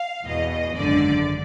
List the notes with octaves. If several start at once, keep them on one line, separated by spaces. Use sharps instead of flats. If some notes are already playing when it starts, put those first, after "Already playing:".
Already playing: F5
E2 B2 D#5
G#1 F#2 D3 D5